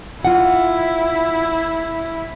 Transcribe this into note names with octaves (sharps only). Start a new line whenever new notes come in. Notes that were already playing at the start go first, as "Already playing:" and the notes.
E4 F4 F#5